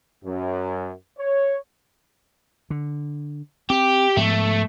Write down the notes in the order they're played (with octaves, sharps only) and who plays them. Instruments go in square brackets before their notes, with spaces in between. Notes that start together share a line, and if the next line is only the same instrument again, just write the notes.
[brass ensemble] F#2
C#5
[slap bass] D3
[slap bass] C4 [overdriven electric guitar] G4
[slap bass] G#2 F3 B3 [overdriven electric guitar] A3